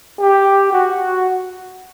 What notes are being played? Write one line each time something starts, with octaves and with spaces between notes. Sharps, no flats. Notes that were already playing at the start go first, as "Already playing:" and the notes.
G4
F#4